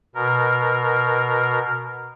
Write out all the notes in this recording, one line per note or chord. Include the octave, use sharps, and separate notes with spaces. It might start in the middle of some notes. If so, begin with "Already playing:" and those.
B2 A#4